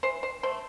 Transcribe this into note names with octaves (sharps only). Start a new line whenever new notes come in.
E3 C5
C5
A3 C5